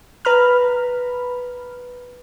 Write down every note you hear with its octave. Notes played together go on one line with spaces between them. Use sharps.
B4 A#5 B5 F6